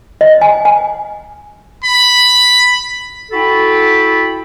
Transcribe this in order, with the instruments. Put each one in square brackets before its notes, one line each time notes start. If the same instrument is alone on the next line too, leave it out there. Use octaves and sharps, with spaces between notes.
[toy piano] D#5
G#5
G#5
[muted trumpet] B5
[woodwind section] E4 F#4 A4 G5 B5